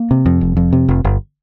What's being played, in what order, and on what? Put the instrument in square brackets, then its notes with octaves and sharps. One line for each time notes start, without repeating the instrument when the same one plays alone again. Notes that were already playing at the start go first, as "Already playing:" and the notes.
Already playing: [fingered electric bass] A#3
C3
F2
F1
F2
C3
F1
G1